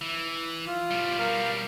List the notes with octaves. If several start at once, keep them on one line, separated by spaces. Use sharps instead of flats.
E3
F4
B2 G3
A#4 F5